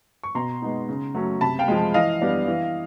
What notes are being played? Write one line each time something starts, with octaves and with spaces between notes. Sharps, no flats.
C#6
B2 A#5 C6
G#3 B3 D#4
C#3
F#3 A3 C#4
C3 A5 B5
F5 G5
F3 G#3
E3 D#5 F5
G3 B3 D4
E3